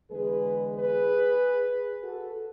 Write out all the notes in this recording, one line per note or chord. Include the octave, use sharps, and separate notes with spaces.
E2 D3 G#3 G#4 B4
G#4 B4
F#4 A4